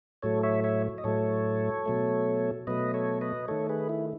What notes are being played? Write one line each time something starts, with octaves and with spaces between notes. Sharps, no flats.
A2 F#3 A3 A4 C#5
C#5 E5
C#5 E5
D#5
A2 F#3 A3 A4 C#5
B2 F#3 A3
B2 F#3 A3 B4 D#5
A4 C#5
B4 D#5
D#3 A3 A4 C#5
G#4 B4
E4